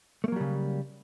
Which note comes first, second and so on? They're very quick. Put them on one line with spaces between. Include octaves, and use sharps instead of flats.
A3 A#3 F#3 G3 C#3